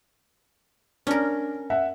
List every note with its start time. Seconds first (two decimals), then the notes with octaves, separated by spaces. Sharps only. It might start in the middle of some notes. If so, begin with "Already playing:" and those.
1.07 C#4 D4 A#4
1.70 E5 F#5